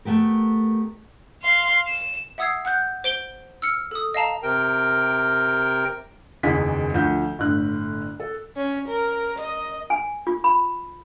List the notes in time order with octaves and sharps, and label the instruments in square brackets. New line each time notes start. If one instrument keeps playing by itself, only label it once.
[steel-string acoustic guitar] A3 B3 G4 A#4
[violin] F5 C6
E7
[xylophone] E5 F#5 D#6 E6 G#6 C7
F#5 F#6 G6
C5 D7 G7
E6 F6 C#7
A4 D#6
D#5 F5 A5 A#5
[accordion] C3 A#4 G5
[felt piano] F#1 E2 D#3 E3 G#4 B6
D2 F3 G6
G1 A2 D3 F#6
A4
[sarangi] C#4
A#4
D#5
[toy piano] G#5
F4
B5